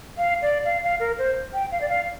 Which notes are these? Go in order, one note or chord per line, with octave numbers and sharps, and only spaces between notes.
F5
D5
F5
F5
A#4
C5
G5
F5
D5
F5